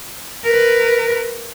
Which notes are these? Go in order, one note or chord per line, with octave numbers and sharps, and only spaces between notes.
A#4 B4